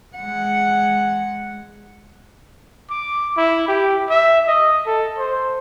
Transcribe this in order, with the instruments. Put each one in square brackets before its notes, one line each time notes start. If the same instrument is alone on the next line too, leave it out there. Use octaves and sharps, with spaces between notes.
[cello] G#3 F#5
[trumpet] D6
E4
G4
E5
D#5
A4
C5